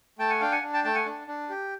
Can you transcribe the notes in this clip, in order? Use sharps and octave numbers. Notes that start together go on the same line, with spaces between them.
A3 G5 A5
F#5 G#5
D4 F5 G5
F#5 G#5
D4
G5 A5
A3 G5 A5
F#5 G#5
D4
D4
G4